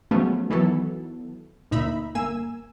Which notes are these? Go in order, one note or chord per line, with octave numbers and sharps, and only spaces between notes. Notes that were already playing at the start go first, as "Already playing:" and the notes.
F3 F#3 G#3 A3 B3 C#4
D#3 E3 F#3 B3 A4
D2 A#2 D#4 E5 B5
G1 A#3 G#5 E6